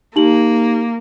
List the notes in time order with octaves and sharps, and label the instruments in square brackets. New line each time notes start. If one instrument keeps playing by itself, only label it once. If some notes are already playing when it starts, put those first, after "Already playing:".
[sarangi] A#3 [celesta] D#4 G4 F#7